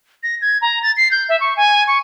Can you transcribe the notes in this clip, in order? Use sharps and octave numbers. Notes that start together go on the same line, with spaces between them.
A#6
G#6
A#5
A6
C7
G6
E5
C#6
G#5
C#6